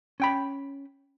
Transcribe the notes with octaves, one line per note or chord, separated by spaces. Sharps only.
C#4 G5 B5